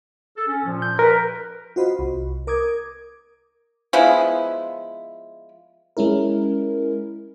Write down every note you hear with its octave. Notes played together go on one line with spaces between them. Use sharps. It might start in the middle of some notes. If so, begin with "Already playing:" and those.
A4
C#4
A#2 F3
G6
A#4 B4
F4 F#4 C5 D#5 B5
C2
A#4 D6 D#6 G#6
F3 G#3 B3 E4
G#3 C#4 E4 A#4